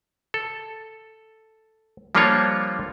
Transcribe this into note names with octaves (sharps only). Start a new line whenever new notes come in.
A4
F3 G3 A#3 D4 F4 C#5